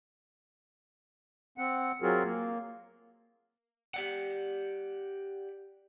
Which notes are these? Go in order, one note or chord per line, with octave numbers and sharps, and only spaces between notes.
C4 F#5
F#3 C4 F4 F#4 G#4 A#4
A#3
G4 D5 F#5